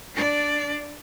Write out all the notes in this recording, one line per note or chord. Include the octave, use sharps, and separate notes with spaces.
D4 D5